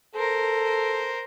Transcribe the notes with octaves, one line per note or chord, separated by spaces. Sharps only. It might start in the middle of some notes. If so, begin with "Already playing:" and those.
A4 A#4 C5